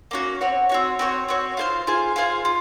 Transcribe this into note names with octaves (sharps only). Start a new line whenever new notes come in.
A#3 C#4 F#4
C4 F#4 C#5
C4 F#4 C#5
C4 F#4 C#5
C4 F#4 C#5
F4 G#4 C5 F5
F4 G#4 C5 F5
F4 G#4 C5 F5
F4